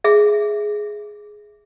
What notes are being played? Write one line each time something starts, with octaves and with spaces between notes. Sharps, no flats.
G#4 E5